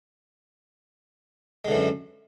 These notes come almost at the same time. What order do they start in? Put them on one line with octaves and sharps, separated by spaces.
G#3 D3 E3 F#2